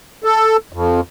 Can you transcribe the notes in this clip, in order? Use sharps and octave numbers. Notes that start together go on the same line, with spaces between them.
A4
F2